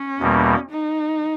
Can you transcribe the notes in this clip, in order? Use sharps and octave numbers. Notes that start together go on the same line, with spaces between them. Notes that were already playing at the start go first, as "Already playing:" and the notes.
Already playing: C#4
E2 B2 G3 A#3
D#4